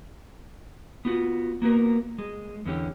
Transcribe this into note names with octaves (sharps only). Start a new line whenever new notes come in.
B3 F4 F#4
A#3 B3 F#4 A#4
G#3
E2 D3 C#4 G4